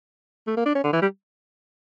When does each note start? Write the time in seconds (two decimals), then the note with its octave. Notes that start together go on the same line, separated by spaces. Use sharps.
0.47 A3
0.57 A#3
0.66 D4
0.75 C#4
0.84 D3
0.93 E3
1.02 G3